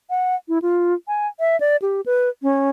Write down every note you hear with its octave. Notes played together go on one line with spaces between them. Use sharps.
F#5
E4
F4
G#5
E5
D5
G4
B4
C#4